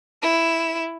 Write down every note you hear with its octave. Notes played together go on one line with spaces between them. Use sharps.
E4 E7